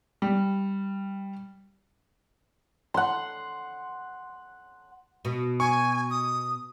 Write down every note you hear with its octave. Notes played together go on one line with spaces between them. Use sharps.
G3
F#5 C6
B2
G#5 C#6
D#6